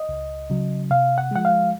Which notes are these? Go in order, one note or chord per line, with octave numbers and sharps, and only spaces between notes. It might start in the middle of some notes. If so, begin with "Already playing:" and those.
Already playing: D#5
C#2
C#3 F#3
C3 F5
F#5
F3 G#3 F#5
F5